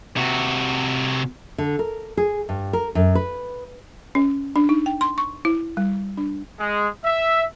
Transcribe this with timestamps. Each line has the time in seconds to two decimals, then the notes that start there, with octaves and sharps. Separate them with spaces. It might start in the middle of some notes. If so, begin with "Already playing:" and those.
0.17 C3 F#4
1.58 D3
1.79 A#4
2.17 G#4
2.49 G2
2.73 A#4
2.95 F#2
3.15 B4
4.15 C#4
4.56 D4
4.69 D#4
4.86 G5
5.01 C6
5.18 C#6
5.45 E4
5.77 G3
6.17 D4
6.59 G#3
7.04 E5